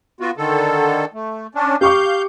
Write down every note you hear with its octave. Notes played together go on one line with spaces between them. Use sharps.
B3 F4 F#4
D3 D#3 A4
A3
C#4 D4
G4 F5 C#6 D6 G6